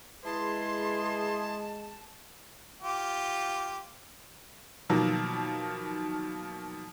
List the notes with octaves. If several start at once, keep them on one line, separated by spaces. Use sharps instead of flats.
G#3 E4 G#4 B4 A5 C6
F4 G4
B2 D#3 F3 F#3 A#3